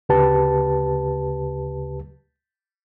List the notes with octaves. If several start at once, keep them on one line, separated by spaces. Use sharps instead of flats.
D2 C#3 G4 B4 A5